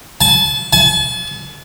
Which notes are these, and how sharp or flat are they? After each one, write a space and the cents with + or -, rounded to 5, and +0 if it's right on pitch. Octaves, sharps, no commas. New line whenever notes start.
A5 -35
A5 -45